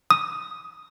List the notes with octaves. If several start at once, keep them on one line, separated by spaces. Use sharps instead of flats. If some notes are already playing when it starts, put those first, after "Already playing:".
D#6